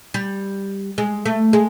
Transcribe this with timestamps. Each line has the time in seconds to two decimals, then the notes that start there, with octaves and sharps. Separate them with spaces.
0.14 G3
0.98 G#3
1.26 A3
1.53 G#3